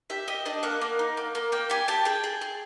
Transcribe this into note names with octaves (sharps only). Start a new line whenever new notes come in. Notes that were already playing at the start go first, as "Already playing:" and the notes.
G4 E5
G4 D#5
D4 D#5
A#3 F#5
A#3
D#4
A#3
A#3
A#3 G5
G4 G#5
G4 A5
G#4 G5
G#4
G#4